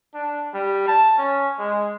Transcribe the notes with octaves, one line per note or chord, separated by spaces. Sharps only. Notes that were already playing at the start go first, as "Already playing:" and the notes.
D4
G3
A5
C#4
G#3